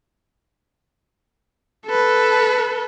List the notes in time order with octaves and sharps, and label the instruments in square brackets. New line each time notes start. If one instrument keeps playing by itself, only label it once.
[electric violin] A4 B4